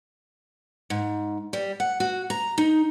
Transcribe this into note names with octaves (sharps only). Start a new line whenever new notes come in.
G#2
G3
F#5
F#4
A#5
D#4